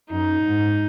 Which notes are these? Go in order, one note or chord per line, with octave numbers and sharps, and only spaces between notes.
F#2 D#4
G#2